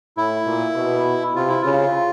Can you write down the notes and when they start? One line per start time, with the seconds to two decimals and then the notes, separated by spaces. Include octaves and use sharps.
0.17 A2 E4
0.46 A#2
0.75 B2
1.35 C3 F4
1.49 E4
1.62 C#3 F4